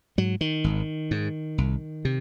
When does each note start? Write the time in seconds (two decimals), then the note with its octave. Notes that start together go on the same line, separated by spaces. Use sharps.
0.18 G#2 F#3
0.41 D#3
0.64 G#1
1.11 G#2
1.58 C2
2.05 C3